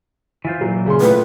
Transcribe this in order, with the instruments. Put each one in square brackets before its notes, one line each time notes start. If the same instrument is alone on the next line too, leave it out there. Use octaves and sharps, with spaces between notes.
[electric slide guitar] E3 F4 C5
[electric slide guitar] A#2 E3 [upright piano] F#3
[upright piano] C#3 C6
[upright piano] A2 F4 [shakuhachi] B4